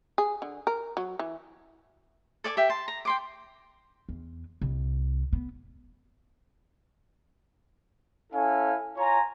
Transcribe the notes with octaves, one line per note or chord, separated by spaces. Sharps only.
G#4
D3
A#4
F#3
E3
A4 D5 G#5 D6
G4 E5 G5
A5 C6
A#5
G5 C6 D6
E2
C2
B3
C#4 E4 A4 F5 G#5
F4 C#5 G#5 A#5